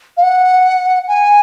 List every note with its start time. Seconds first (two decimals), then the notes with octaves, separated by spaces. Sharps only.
0.17 F5
0.22 F#5
1.07 G#5